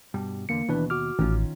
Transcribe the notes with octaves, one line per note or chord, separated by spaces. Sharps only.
G2 B2 G3
E2 D3 A#3 C#7
D#2 B2 E3 D4 B4
F#4 D6 F6
A1 D#3 C#4 F4